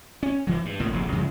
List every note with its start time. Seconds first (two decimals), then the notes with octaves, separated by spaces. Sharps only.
0.23 C#4
0.47 D#3 E3 F#3
0.65 G2
0.79 G#1 A2 A#3
0.93 F1 A#1 B2
1.12 F#2 C#3 F3 G#3